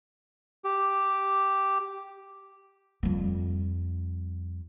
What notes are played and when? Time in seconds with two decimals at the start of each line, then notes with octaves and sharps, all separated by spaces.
0.64 G4
3.03 F2 G3